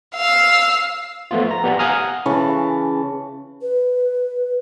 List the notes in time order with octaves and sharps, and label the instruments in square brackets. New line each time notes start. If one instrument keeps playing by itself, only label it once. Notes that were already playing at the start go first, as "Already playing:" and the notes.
[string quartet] F5 E6
[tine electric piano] F3 A3 B3 F4
A#5
B3 G4 D5 F#5 G#5
F5 F#5 G#5 A#5 D#6 F6
[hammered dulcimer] C#3 E3 A5 C#6
[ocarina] B4